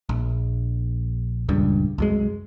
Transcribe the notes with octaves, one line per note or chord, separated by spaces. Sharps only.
A#1
D#1 C#2 G2
C2 F#2 G#3